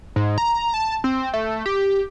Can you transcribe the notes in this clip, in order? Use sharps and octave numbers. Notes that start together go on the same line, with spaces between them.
G#2
A#5
A5
C4
A3
G4